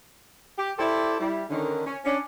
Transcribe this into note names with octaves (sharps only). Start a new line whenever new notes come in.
G4
E4 G4 A4 C5 D5 E5
G3 E4
D3 D#3 C#4
C#4
C#4 D4